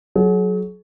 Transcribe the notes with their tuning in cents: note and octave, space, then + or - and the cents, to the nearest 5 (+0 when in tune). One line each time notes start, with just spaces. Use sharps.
F#3 +0 G#4 +40